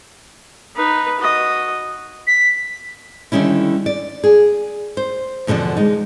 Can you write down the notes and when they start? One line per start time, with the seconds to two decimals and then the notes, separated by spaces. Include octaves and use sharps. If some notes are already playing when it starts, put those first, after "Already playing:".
0.76 D#4 B4
1.21 F#4 D#5
2.27 B6
3.32 D3 D#3 G3 C#4 E4
3.86 D5
4.24 G#4
4.97 C5
5.47 E2 B2 D3 F3 D4
5.77 G#3 D#4